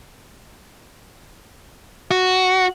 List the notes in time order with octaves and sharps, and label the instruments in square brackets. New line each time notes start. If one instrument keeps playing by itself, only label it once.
[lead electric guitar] F#4